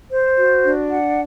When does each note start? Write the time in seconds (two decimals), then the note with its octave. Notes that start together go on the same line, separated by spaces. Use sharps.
0.10 C5
0.37 F#4
0.63 D4
0.89 F#5